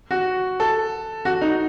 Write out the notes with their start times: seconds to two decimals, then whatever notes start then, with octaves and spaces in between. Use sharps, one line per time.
0.11 F#4
0.60 A4
1.25 F#4
1.42 D#4